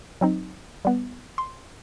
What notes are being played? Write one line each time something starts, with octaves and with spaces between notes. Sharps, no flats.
F#3 C4 D#4
G3 B3
C6